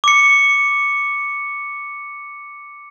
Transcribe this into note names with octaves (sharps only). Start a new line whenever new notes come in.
D6 C#7